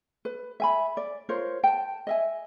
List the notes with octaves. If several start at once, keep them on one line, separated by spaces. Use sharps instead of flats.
B4
E5 G#5 B5
D5
F4 A#4 C5 C#5
G5 A5
D#5 E5 G#5